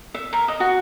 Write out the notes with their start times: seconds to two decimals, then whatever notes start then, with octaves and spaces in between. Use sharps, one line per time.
0.14 E5
0.33 A#4
0.48 D#5
0.60 F#4